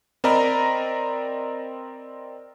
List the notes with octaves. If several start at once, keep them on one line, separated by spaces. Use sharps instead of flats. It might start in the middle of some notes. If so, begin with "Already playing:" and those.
C4 A#4 D5 D#5 A#5 B5